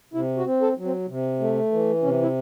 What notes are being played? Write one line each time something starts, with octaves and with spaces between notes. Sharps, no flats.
C3 E4
F#4
C4
A4
F#3
C4
C3
A3
E3
C3 C#4
E4